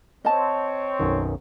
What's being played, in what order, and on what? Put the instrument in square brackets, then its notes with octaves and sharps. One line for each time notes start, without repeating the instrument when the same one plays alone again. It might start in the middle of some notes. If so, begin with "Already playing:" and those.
[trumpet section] C4 C#5 [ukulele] D#5 A5
[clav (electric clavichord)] B1 F#2 D#3